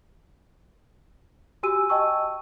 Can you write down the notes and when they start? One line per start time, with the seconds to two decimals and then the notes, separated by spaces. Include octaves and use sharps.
1.63 F#4 G4 G#5 E6 D#7
1.89 D#5 G5 A5 C#6 E6